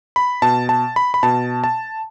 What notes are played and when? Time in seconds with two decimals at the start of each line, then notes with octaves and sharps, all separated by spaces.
0.16 B5
0.42 B2 A5
0.69 A5
0.96 B5
1.14 B5
1.23 B2 A5
1.64 A5